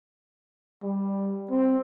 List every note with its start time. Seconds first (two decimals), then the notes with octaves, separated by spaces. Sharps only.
0.83 G3
1.51 C4